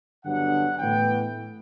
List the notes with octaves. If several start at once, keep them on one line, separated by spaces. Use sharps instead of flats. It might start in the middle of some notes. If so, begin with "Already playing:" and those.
G2 D3 F#3 B3 D4 F#5
A2 E3 B3 G5